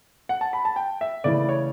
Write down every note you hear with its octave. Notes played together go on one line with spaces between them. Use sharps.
F#5
A5
B5
A5
G5
E5
C#3 E3 A3 C#4 E4 D5
C#5